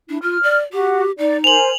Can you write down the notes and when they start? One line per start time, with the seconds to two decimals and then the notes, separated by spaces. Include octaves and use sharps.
0.09 D4 E4
0.23 F4 F6
0.43 D5
0.73 F#4 G4
1.18 D#4 D5
1.44 A#4 C5 G#5 F7 F#7